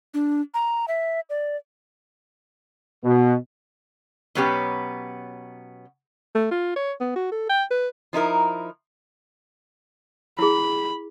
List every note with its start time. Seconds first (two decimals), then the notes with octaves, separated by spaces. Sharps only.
0.14 D4
0.54 A#5
0.88 E5
1.30 D5
3.03 B2
4.35 B2 F#3 B3 C#4 G4
6.35 A3
6.51 F4
6.76 C#5
7.00 B3
7.16 F#4
7.32 A4
7.49 G5
7.71 B4
8.13 F3 D#4 E4 A#4
10.39 E4 G#4 B5